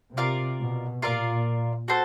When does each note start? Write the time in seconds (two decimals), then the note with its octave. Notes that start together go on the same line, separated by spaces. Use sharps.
0.16 C3 F4 A#4 D5 F5
0.59 B2
1.02 A#2 F4 A#4 D5 F5
1.88 F#4 A4 C5